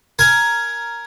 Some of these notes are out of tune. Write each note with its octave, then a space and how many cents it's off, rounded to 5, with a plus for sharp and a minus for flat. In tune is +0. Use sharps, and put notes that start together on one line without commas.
A#4 +0 G#5 +10